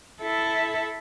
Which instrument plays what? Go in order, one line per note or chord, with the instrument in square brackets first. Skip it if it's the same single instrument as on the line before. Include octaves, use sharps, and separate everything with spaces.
[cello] E4 A4